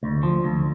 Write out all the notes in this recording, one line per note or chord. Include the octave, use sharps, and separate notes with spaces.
D2
F3
D2